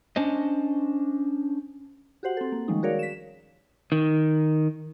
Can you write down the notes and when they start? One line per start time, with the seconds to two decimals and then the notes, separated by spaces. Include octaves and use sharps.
0.16 C#4 D4 C5 D#5
2.23 F#4 G4 C5 F#5
2.37 C4 A4
2.52 A#3
2.68 D#3 F3 G3 G#3 C#4 D#4
2.83 F#4 G#4 A#4 C#5 D5 F5
2.99 B6 E7
3.92 D#3